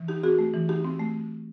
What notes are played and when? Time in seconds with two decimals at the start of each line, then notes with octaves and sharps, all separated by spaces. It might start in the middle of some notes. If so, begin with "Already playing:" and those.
Already playing: E3
0.08 D#4 G4
0.23 C4 F#4 G#4
0.39 A3
0.54 E3
0.69 D#4 G4
0.85 C4
0.99 A3